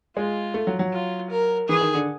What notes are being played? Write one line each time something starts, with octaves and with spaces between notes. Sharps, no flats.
G#3 F4
A3
F#3
F#3
F4
A#4
E3 G#4
D#3
D3